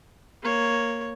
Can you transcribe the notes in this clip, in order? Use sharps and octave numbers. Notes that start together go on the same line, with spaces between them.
A#3 C#5